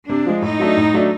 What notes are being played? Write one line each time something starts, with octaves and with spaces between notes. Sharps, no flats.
C3 D4
F3 G#3
A2 D#4
F#3 A3 D4
A2
F#3 A3 D4